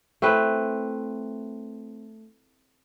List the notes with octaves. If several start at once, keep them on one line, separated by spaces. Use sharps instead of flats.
A3 C4 E4 B4